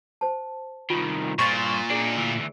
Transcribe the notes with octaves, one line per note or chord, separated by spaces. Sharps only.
C5 A5
C2 D#3 F4
G2 A#2 C5 C#6 A6
D4 D#4 G#4 D5 D7
D2 E3